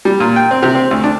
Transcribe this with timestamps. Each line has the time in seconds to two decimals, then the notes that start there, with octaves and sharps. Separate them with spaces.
0.05 G3
0.20 A#2
0.36 G5
0.51 C4
0.63 C3
0.75 C4
0.91 D2
1.04 D4